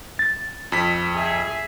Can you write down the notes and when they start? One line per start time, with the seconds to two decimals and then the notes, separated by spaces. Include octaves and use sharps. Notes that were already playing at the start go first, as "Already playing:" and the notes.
0.19 A6
0.72 F2 B6
1.14 G#4 E5